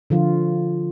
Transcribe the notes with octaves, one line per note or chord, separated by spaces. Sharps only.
D3 F3 F4